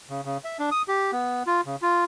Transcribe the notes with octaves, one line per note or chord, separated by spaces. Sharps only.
C#3
C#3
E5
D4
D#6
G4
B3
F4
C#3
F4